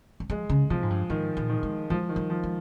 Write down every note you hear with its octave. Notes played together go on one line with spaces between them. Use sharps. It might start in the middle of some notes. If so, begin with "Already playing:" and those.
G3
F3 G#3
C#3
C3 F3
G#2
G2
G#2 D#3
A#2
D#3
G#3
F3 G#3
D#3
G3
F3
G#3